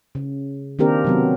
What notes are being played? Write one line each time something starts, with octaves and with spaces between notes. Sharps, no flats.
C#3
D#3 A#3 C4 D4 G4 A#4
C3 F#3 B3